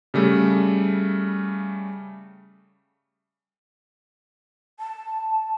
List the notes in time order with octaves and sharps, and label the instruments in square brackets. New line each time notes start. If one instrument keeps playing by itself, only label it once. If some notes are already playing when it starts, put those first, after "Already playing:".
[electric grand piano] C#3 G3 A3
[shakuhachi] A5